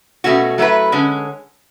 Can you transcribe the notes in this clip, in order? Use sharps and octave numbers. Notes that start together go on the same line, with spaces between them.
B2 A3 C#4 F#4
F#3 A3 E4 B4
D3 G#3 C#4